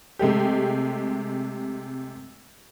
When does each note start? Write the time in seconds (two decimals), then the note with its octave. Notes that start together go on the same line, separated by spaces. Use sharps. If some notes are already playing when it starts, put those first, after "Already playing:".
0.19 C3 G#3 A3 G4